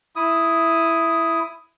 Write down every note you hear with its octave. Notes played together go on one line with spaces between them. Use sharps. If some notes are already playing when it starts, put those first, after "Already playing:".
E4 D#6